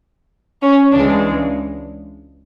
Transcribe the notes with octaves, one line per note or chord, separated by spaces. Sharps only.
C#4
C#2 C#3 E3 G#3 D4